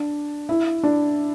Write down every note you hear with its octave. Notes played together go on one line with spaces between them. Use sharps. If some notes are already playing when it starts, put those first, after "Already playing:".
Already playing: D4
E4
D4